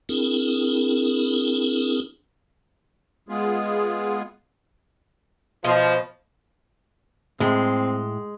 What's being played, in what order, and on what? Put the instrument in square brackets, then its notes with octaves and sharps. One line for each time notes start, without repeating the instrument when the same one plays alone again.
[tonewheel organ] C4 D4 E4 G#4 A#4
[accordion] G#3 B3 F4 G#4
[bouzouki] B2 D#5 [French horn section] F3
[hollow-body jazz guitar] A2 [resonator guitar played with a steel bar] G#3 [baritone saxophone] C4